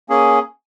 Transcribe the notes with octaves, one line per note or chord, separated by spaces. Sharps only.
A#3 C#4 G#4